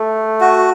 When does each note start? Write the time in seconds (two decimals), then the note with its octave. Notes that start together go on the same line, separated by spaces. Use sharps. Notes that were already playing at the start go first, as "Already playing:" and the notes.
Already playing: A3
0.41 F#4